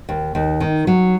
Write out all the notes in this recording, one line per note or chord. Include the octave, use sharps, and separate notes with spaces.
D#2
D#2
D#3
F#3